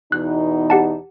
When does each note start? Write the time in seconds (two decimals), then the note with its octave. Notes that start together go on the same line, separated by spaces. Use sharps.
0.12 E2 B2 D#4 F#6
0.70 G4 F#5 A5